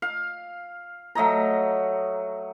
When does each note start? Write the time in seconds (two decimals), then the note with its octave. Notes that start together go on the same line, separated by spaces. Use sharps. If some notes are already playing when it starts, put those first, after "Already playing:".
0.02 F5
1.15 F#3 A3 D#5 A#5